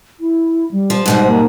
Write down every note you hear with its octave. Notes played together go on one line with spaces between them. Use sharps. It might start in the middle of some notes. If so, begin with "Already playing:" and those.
E4
G3
F3
G#2 B2 G3 C5
A#3